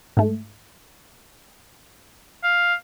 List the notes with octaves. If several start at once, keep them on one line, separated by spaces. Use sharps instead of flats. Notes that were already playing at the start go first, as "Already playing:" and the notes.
G#2 A3
F5